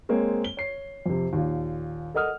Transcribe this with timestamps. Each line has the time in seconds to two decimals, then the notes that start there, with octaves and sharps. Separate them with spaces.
0.09 G#3 A#3 C4 C5 C#5
0.44 G7
0.57 C#5 C7
1.06 F2 C3
1.33 D#2 A#2
2.14 A4 A#4 D#5 F#5 D#6 F6